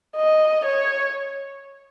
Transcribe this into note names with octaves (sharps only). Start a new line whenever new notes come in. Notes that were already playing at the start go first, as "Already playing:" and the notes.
D#5
C#5